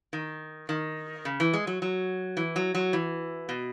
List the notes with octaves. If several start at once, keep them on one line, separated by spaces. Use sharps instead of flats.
D#3
D#3
C#3
E3
G#3
F#3
F#3
E3
F#3
F#3
E3
B2